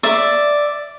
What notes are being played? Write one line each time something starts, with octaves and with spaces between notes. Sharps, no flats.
D5 E5